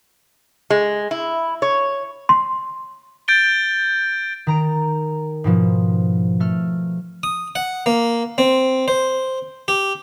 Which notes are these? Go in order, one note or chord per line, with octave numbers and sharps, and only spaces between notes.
G#3
E4
C#5
C6
G6 A6 D7 G7
D#3 A#5 D7
G#2 B2 F3
A3 F6
D#6
F#5
A#3
C4
C5
G4